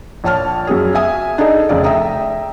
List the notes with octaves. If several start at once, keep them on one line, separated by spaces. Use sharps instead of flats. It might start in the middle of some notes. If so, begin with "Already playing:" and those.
A#1 C#5 A5 F6
F#2 C#4 G#4
E5 G#5 D#6
D4 D#4 G#4 A4 D#5
F1 C#3 D5
E5 G5 A#5 D#6